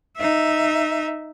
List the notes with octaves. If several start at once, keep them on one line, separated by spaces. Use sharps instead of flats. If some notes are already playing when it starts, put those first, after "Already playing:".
D#4 E5